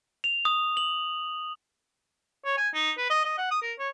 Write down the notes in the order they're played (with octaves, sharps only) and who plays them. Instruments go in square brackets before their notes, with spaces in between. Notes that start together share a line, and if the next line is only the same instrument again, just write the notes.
[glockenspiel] F7
D#6
F#7
[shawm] C#5
G#5
D#4
B4
D#5
D#5
F#5
D#6
A#4
C#5